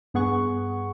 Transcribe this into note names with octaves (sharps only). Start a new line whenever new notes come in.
G2 B3 G#4 F#5 C#6